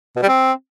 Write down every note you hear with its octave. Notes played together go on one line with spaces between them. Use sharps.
B2
G3
C4